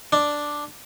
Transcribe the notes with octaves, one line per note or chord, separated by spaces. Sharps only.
D4